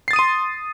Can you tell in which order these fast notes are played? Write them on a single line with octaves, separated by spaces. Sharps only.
C7 A6 D#6 D#7 C6